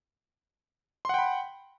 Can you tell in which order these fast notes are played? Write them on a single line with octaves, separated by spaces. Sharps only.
C6 F#5 G5 B5